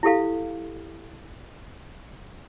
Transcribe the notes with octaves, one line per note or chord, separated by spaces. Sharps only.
E4 G4 A4 F5